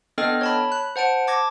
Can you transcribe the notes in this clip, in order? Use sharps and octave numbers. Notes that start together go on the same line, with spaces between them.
B3 D4 A4 D#5 G5 F6
C#5 A5 B5
F#6
C5 F#5 A5 D7
A5 D6 G#6 A#6